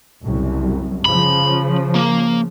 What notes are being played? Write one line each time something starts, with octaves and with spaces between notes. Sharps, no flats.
F#1 C2 F#2
C#3 F3 B5
A#3